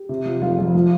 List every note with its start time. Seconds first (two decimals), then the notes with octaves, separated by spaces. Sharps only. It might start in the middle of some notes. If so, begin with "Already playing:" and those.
Already playing: G4
0.09 C3
0.26 F3
0.41 F1 F4
0.59 F2
0.75 F3